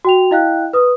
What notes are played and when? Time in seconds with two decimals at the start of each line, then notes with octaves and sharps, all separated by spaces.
0.05 F#4 G5 F7
0.31 E4 D#5 F5 G5 F#6
0.73 B4 D#6